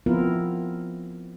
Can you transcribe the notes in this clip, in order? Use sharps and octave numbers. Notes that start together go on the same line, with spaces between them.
F3 B3 C4 E4 F4 A#4